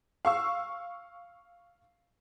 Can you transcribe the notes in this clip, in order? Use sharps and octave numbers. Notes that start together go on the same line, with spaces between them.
F5 C#6 E6